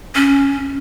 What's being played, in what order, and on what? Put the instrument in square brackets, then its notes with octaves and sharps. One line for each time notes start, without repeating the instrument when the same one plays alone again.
[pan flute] C#4